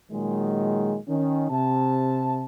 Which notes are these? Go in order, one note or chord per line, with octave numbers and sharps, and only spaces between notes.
A#2 D#3 F#3 G#3
D#3 C#4
C3 A5